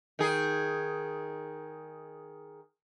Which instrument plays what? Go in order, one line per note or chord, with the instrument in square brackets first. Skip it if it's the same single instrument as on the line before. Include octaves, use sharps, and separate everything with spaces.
[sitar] D#3 G#4